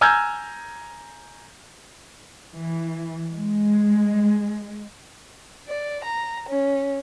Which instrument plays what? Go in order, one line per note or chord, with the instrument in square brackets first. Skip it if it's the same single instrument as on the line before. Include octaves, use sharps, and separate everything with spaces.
[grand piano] G#5 A#5 E6 F6 G6 G#6
[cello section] E3
G#3
[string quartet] D5
A#5
C#4